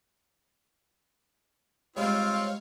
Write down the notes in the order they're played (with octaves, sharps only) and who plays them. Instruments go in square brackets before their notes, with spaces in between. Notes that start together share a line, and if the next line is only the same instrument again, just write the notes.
[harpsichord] G3 G#3 [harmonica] C4 F4 [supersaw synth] C#5 F5